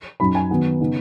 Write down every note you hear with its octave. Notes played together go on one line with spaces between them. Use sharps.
F#2 F#3 D#4 B5
G#5
D#3 F#3 B3 D#4
C#3 B3 D#4